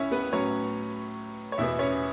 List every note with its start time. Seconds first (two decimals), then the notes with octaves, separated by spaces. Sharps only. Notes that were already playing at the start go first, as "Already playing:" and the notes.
Already playing: C#2 C#4 E4 C#5 E5
0.12 B3 B4
0.32 A2 F#3 B3 C#4 C#5
1.52 C#5
1.58 E2 B2 B3 E4 E5
1.79 C#4 C#5